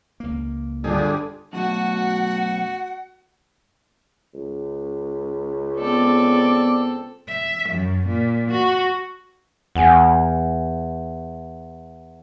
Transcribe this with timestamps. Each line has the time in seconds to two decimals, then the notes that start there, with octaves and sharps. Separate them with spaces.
0.20 C#2 A#3
0.84 G1 G3 D4 F4 G#4
1.53 F#2 B2 F#3 A3 F#4 F#5
4.34 C#2
5.77 B3 C4 A4 D5
7.28 E5
7.69 F#2
8.06 A#2
8.50 F#4
9.75 E2 F#5 G#5